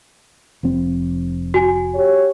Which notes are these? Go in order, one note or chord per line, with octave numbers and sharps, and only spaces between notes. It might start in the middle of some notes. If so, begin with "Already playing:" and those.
F1 F3 C4
F#4 G#5
G4 C#5